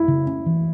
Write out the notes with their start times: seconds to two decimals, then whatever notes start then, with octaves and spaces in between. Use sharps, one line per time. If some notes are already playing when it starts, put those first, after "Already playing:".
Already playing: E4
0.08 C#3
0.27 C#4
0.46 E3